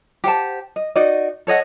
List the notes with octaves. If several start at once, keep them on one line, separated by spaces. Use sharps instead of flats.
G4 C5 F#5 A5
D#5
D#4 F#4 D5 D#5
A4 C#5 D#5 F#5